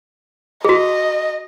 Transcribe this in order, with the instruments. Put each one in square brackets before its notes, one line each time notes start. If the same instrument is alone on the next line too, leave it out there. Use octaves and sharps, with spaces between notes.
[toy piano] F#4 G#4 [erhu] D#5